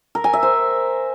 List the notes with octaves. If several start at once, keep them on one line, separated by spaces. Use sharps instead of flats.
A#4
G#5
E5
C5